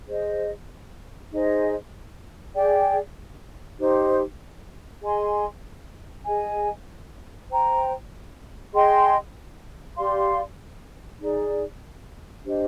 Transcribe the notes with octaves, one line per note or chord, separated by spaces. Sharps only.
G#4 C5 D#5
D#4 G#4 C5 D#5
G#4 D5 G5
D#4 G4 C5
G#4 D#5 G#5 C6
G#4 D#5 G#5
C5 G5 A#5
G#4 D#5 G5 C6
G4 D5 F5 C6
D#4 G#4 D5
D4 G4 C5 D#5